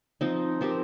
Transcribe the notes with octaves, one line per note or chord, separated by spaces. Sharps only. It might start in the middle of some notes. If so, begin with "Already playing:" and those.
F3 C4 D#4
F3 C4 G4 A#4